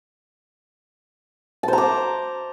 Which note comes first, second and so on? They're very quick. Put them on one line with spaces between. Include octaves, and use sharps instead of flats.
A5 C5 A#5 D6